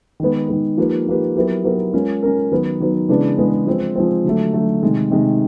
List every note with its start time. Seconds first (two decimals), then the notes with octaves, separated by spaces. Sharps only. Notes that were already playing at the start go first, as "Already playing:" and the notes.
0.20 D#3 G#3 B3
0.49 D#3 G#3 B3
0.78 F3 A#3 D#4 G4 B4
1.07 F3 A#3 D#4 G4 B4
1.36 F#3 B3 E4 G4 A#4
1.64 F#3 B3 E4 G4 A#4
1.93 G#3 C#4 F4 A#4
2.23 G#3 C#4 F4 A#4
2.52 D#3 F#3 B3
2.80 D#3 F#3 B3
3.09 C#3 E3 G#3 B3 D4
3.38 C#3 E3 G#3 B3 D4
3.67 F3 G#3 C4
3.96 F3 G#3 C4
4.25 D3 F#3 A3
4.53 D3 F#3 A3
4.82 C3 D#3 G#3
5.11 C3 D#3 G#3